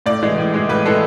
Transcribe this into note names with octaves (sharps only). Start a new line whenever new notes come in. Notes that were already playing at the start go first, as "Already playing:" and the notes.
A2 D5
E3 G#3
A2
E3 G#3
A2 B4
E3 G#3 A4